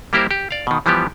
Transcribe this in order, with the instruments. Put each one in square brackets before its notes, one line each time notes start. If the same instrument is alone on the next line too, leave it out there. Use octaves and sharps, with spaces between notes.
[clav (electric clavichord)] G3 A#3 E4 G4 A#4 C5
G4
D5 F5
B2 D#3
E3 F3 G3 B3 G4